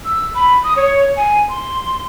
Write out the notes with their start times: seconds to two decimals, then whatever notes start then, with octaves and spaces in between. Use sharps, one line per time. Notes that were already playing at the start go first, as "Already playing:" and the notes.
0.05 E6
0.35 B5
0.64 D#6
0.77 C#5
1.17 G#5
1.49 C6